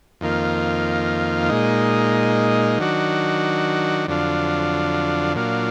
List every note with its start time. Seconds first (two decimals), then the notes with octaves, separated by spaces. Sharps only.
0.21 F2 D#3 A#3 F4
1.50 A#2 G#3 D#4
2.78 D#3 F#3 D4 F#4
4.07 F2 D3 F#3 D4 F4
5.36 A#2 F#3 D4 F4